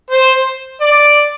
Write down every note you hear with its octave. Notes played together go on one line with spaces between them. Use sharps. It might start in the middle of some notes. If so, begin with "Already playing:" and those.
C5
D5